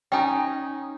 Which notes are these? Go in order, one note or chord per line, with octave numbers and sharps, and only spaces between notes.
C#4 D#4 G5 G#5